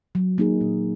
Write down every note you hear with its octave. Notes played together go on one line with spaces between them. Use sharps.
F#3
A#3 D#4 G#4
A#2